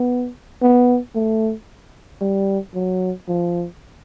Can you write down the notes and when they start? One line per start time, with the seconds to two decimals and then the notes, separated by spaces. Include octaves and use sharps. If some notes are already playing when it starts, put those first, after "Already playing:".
Already playing: B3
0.62 B3
1.15 A3
2.21 G3
2.74 F#3
3.28 F3